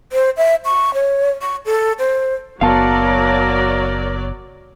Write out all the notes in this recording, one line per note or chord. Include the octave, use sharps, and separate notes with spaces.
C5
E5
C#6
C#5
C#6
A4
C5
F#1 F#3 B3 A#4 D5 F5 A5